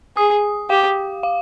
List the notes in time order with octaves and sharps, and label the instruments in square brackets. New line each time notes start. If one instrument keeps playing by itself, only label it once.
[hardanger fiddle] G#4 [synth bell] D#6
[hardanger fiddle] G4 [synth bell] F5
[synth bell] F5